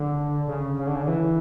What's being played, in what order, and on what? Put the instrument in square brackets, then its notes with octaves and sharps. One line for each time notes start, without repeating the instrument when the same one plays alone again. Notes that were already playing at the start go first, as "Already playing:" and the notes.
Already playing: [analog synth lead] D3
C#3
C#3
D3
C#3
D3
E3